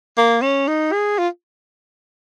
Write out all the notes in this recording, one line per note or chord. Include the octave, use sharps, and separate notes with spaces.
A#3
C#4
D#4
G#4
F4